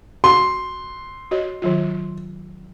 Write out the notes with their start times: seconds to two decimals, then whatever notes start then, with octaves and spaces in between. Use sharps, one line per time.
0.24 F#4 C6
1.31 F#4 C#5 D#5
1.62 D#3 F#3 F4